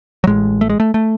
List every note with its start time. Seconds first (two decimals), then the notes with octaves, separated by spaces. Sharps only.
0.24 F#3
0.27 A1 A2 G#3
0.61 A3
0.70 G#3
0.80 A3
0.94 A3